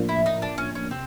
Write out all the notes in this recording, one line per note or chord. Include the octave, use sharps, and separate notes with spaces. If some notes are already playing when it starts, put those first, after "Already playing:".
Already playing: A2 F3 A#3 D4
E4
D#4
D4
C#4
C#4
C3 C4